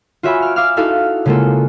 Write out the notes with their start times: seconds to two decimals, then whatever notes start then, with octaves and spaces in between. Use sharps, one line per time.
0.23 F4 F#4 C#5 E5 G#5 B5
0.42 F6 D7
0.56 F5 D6 E6 F6
0.77 D#4 E4 F#4 A4 E5 F5
1.25 C#3 G#3 A#3 F4 F#4 A4